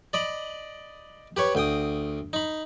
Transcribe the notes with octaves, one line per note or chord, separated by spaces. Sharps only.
D5 D#5 B5
G4 B4 C#5
D2 G5 D#6
D#4 B5